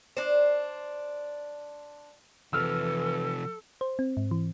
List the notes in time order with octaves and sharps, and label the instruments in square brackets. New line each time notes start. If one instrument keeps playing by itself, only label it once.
[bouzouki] D4 C5
[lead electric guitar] C3 F3 [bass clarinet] E3 [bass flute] A4 [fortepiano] E6 F6
[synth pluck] C5
C4
G#2
E3